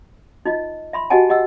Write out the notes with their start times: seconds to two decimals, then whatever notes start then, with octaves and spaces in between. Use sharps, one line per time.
0.45 D#4 F4 D#5
0.93 E5 B5 C6
1.10 F#4 G4 D#5 F#5 G#5 A5
1.29 G4 D#5 F#5 E6